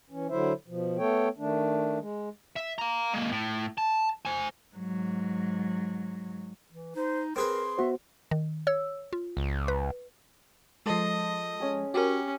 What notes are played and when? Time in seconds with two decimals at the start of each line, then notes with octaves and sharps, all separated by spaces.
0.10 E3 C#4
0.29 D3 F#3 E4 C5 E5
0.68 B2 F3
0.98 A3 B3 A4 C#5 G5
1.38 D#3 A3 D4
1.99 G#3
2.56 E5
2.78 F5 A#5
3.13 G#3 A#3
3.32 A2
3.78 A5
4.25 C5 G#5
4.76 G#2 F#3
6.72 E3
6.96 D#4 C5
7.36 C4 G#4 A#4 B4 C6
7.78 B3 F#4 C5 E5
8.31 D#3
8.67 C#5 E6
9.13 F4
9.37 C#2
9.68 B4
10.86 F3 G#3 A4 C5 D#5
11.60 C#4 G#4
11.94 C#4 F#4 G4 A#4